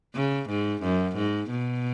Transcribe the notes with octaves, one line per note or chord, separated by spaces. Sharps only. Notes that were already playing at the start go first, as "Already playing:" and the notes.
C#3
G#2
F#2
G#2
B2